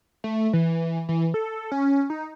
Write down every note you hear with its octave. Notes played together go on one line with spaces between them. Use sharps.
A3
E3
E3
A4
C#4
D#4